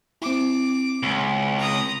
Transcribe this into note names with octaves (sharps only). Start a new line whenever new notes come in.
C4 E4 D6
C#2
A#5 D#6